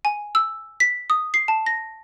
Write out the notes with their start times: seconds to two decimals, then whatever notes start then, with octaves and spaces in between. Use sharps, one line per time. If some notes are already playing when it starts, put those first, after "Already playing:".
0.05 G#5
0.35 E6
0.80 B6
1.10 D#6
1.34 C7
1.48 A5
1.66 A#6